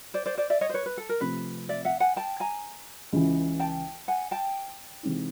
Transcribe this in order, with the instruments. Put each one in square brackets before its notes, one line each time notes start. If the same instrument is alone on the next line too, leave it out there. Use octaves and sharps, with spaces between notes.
[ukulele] C5 D5
C5 D5
C5 D5
D5 E5
C#5 D#5
C5
B4 C#5
B4
A4
A#4
[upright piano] C3 F3 A3 C4 [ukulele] B4
[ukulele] D5 E5
E5 F#5
F#5 G#5
G5 A5
G#5 A#5
[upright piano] C#2 C#3 E3
[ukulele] G5 A5
F#5 G#5
G5 A5
[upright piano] C3 E3 G#3 C4 D#4